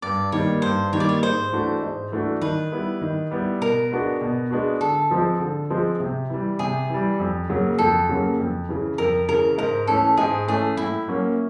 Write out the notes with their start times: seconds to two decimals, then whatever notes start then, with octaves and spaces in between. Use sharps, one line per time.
0.02 G2 D5
0.32 D#3 G3 A#3 C#5
0.62 G2 C5
0.93 D#3 G3 A#3 C#5
1.00 D5
1.09 C#5
1.22 G#2 C5
1.52 E3 A3 D4 F#4
1.82 G#2
2.12 E3 A3 D4 F#4
2.41 D#3 B4
2.72 G3 B3 E4
3.01 D#3
3.31 G3 B3 E4
3.61 B2 A#4
3.91 G#3 B3 D4 F#4
4.21 B2
4.50 G#3 B3 D4 F#4
4.81 D3 A4
5.11 F3 G#3 C4
5.40 D3
5.70 F3 G#3 C4
6.00 C3
6.30 E3 G3
6.59 C3 G#4
6.89 E3 G3
7.19 F2
7.49 C#3 F#3 A#3 C#4
7.78 F2 A4
8.09 C#3 F#3 A#3 C#4
8.39 F2
8.68 C#3 E3
8.98 F2 A#4
9.29 C#3 E3 A#4
9.58 G#2 A#4
9.87 E3 A3 C#4 A4
10.17 G#2 G#4
10.47 E3 A3 C#4 G#4
10.77 A2 E4
11.08 F#3 A#3 C#4